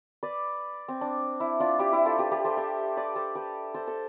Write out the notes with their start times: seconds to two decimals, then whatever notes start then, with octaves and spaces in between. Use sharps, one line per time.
0.23 B4 D5
0.88 C4
1.01 D4
1.40 E4
1.60 D4 F4
1.79 E4 G4
1.93 E4 G4
2.05 F4 A4
2.18 G4 B4
2.31 G4 B4
2.44 A4 C5
2.57 C5 E5
2.97 B4 D5
3.16 A4 C5
3.35 G4 B4
3.74 A4 C5
3.87 A4 C5